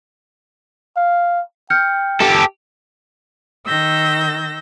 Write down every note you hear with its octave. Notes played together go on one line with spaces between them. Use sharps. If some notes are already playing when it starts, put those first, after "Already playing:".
F5
G5 F6 G6 C#7
G4 A4
D#3 E6 G6 A#6